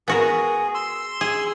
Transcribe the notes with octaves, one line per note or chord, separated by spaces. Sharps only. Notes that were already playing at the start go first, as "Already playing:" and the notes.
B3 F#4 G#4 A#4
C6 E6
G#4